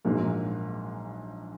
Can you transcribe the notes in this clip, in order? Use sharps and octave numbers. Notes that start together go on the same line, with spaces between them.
A#1 G#2 F#3 A#3